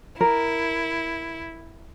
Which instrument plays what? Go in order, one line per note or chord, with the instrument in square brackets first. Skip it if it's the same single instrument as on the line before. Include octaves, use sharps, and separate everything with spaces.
[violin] E4 [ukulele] A#4